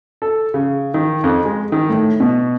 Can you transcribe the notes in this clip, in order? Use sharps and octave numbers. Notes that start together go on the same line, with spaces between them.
A4
C#3
D#3
F2
G#3
D#3
A2
B2